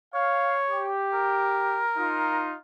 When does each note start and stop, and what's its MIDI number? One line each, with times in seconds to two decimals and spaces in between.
0.14 0.89 73
0.14 0.55 77
0.69 1.83 67
1.14 2.43 70
1.97 2.55 63
1.97 2.55 65